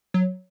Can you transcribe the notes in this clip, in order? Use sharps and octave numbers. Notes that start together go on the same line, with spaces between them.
F#3